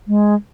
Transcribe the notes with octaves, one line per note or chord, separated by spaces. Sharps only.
G#3